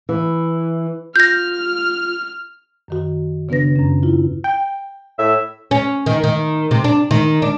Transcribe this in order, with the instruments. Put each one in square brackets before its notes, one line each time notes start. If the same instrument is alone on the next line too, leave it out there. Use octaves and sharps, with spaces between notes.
[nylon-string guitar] E3
[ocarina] F4 [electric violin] F6 [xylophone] G6 A#6
[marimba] F#2 D#3 F#4
C#3 B3 D4 B4 A#6
F#2 C#4
E4 F4
[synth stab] G5
[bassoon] A2 [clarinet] E5
[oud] C#4
D#3
D#3
C3
D4
D#3
D4